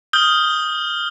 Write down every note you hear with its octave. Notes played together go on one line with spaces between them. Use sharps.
D#6 F6 G6 G7